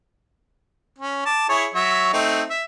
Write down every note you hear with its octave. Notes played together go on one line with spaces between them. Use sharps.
C#4
A5 D6
E4 G#4 C#5
F#3 C#5 E5
A3 C4 D#4
E5